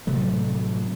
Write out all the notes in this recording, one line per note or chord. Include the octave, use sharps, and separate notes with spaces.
A2 C3 F#3 A3